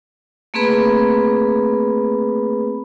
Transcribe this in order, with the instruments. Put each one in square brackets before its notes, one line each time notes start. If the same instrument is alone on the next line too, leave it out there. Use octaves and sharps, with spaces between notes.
[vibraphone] A3 A#3 C4 G#4 B4 B5